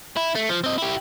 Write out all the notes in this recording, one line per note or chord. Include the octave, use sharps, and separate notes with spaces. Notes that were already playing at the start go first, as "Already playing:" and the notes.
E4
A3
F3
C4 D#5
E4 G4